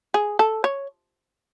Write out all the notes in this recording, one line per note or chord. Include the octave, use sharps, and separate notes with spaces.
G#4
A4
C#5